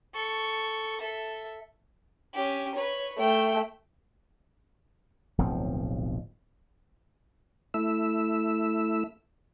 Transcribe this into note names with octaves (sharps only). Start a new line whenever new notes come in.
A4 C#6
A4 E5
C#4 G4
B4 C#5
A3 G5
D1 B1 F3 C4
A3 E4 E6